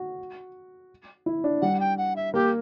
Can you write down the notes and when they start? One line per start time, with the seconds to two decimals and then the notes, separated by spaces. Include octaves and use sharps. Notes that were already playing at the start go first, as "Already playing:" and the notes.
Already playing: F#4
1.26 E4
1.44 D4
1.62 G3 F#5
1.80 G5
1.98 F#5
2.16 E5
2.34 A#3 G4